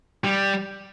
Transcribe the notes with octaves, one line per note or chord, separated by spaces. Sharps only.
G3